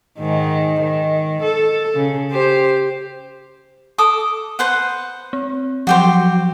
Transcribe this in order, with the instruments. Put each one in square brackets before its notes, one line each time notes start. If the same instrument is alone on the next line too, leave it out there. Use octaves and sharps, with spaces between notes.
[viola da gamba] G#2 D#3
D#3
A4
C#3
G4 C5
[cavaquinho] A4 D6 D#6
B4 C5 F#5
[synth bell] C4
[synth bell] F3 F#3 [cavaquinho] F#4 G4 C5